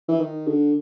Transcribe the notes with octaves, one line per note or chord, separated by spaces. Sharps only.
E3
D#3
D3